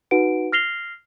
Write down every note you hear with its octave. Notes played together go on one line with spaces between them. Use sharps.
D#4 F#4 B4 F#5 D7
F6 A#6 C7 F7 G7